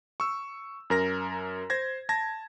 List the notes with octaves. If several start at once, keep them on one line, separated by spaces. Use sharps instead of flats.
C#6 E6
F#2 A#4 A#6
C5 G#6 A#6
A5 G#6 A#6